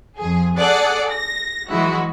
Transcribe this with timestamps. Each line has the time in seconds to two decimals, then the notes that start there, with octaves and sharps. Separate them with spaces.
0.17 F2 G#4
0.56 G#4 A4 D5 F#5
1.11 A#6
1.69 E3 F#3 G#3 E4 F#4